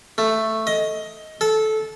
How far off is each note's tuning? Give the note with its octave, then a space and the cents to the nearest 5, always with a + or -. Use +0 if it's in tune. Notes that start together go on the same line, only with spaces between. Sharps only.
A3 +5
D#5 +15
A4 -15